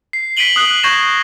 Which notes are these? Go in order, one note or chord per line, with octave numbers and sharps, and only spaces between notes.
C7
B6 C7 D7 D#7 F#7 G7
D#6 F#6 C7 F#7
C#6 G6 G#6 A#6 C7 E7